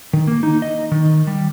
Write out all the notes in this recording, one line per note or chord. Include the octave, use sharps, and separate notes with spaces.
D#3
A#3
D#4
D#5
D#3
G3